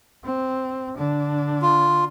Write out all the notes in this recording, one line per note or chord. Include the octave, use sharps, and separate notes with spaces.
C4
D3 D4
F4